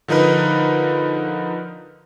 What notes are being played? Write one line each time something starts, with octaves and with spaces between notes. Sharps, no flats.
D3 F3 D#4 A#4 B4